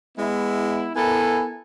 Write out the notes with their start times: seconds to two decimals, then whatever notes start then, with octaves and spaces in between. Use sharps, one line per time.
0.18 G#3 B3 E4
0.95 B3 E4 A4 A#4 G#5